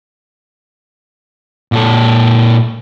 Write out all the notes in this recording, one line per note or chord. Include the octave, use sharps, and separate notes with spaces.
A#2 A4